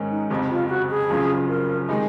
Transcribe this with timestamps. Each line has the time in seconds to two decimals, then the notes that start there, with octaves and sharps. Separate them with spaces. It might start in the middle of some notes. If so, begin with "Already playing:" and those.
Already playing: G#2 D#3 G#3 C#4
0.10 D#4
0.30 F#1 F2 C3
0.50 F4
0.69 F#4
0.90 G#4
1.10 F#1 F#2 C#3 F3
1.49 A#4
1.88 C3 D#3 G#3 D#4 G#4